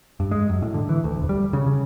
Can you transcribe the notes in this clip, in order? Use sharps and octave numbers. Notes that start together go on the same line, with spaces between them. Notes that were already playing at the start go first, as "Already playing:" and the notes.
G2
G#3
F#2
A2
D3
E3
D2
E1
G3
C#3
C#3